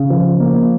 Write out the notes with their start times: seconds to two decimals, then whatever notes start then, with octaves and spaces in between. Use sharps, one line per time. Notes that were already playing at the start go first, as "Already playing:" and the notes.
Already playing: C#3
0.10 F3
0.40 A#3